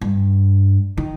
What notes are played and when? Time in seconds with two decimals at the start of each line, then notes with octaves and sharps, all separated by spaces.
0.01 G2
0.98 D#3